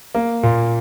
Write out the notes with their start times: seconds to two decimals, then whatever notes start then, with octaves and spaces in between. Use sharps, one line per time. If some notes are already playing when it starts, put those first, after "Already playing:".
0.15 A#3
0.43 A#2